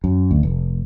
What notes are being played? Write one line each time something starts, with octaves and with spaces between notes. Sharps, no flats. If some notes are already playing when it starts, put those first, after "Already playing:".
F#2
D2
F1